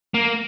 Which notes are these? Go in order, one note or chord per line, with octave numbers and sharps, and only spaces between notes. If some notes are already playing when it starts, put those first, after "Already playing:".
A#3